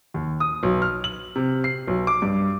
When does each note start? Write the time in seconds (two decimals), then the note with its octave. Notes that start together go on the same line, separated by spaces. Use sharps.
0.14 D#2
0.40 D#6
0.63 B1
0.82 F6
1.04 F#7
1.36 C3
1.64 C7
1.87 B1
2.07 D6
2.22 G2